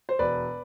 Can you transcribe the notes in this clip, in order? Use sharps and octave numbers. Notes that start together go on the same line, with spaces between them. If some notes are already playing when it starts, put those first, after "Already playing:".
C5
E1 B4 D5